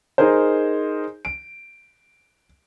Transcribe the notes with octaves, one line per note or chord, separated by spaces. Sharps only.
D#4 G#4 A#4 C5
D7